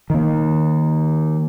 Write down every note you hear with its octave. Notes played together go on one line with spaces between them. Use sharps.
D#3 A#3